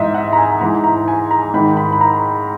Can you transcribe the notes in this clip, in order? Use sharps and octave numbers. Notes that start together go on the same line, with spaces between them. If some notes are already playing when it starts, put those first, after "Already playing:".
Already playing: G#2 E3 D#5 E5
F#5
A#5
G#5
G#2 E3 A#5
A#5
G#5
A#5
G#2 D#3 B5
B5
B5
A#5